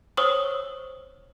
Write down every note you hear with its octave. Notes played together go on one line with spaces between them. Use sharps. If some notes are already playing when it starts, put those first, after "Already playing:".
C5 C#5 C#6 D#6 E6